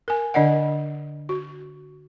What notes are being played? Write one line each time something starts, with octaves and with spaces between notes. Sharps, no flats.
A#4 G#5
D3 D4 D5 D#5 F#5
F#4